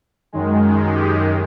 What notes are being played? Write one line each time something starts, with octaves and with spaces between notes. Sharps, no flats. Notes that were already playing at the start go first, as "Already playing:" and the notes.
F#2 D#3 G#3
G4